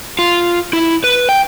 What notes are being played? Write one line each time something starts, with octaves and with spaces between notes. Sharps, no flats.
F4
E4
B4
G5